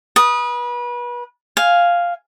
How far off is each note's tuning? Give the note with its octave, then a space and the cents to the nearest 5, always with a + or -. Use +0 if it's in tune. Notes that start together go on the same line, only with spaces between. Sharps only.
B4 -30 D#6 +0
F5 +0 G#5 +0